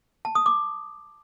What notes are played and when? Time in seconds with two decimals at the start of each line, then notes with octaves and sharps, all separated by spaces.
0.25 A5
0.35 D#6
0.46 D6